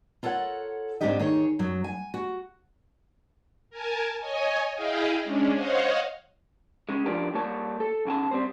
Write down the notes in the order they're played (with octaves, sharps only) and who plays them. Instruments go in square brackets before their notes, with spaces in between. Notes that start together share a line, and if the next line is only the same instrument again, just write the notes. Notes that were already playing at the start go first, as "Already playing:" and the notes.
[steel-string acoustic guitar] F4 A4 A#4 C#5 F#5
G#2 C4 D4 D#4 G4 D#5
D#3 G#4 C#5
F#2 F#3
G#5
F#4
[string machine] A#4 G#5 A5
C#5 D#5 G#5
E4 G#4 D#5 F5 G5
G#3 C#4 D4
C5 C#5 D#5 F5 F#5
[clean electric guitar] C#3 G#3
F3 D4 G4 A#4
G3 A#3 C#5 A5
A4
B1 C#3 G#5 A5
G3 C4 C5